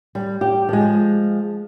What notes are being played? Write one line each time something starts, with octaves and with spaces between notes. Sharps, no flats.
G3
G4
F3 G#3